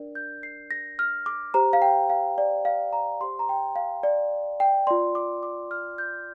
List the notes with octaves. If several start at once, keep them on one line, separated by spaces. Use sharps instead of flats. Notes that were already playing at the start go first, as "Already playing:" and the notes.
Already playing: D4 A#4 D5
G6
C7
A#6
F6
D6
G4 C5 A#5
F5
G5
F5
D5
F5
A#5
G4 C5 C6
A#5
G5
F5
D5
G5
F4 D5 C6
D6
D6
F6
G6